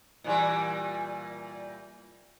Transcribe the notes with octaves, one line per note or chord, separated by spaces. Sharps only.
A#2 E3 G3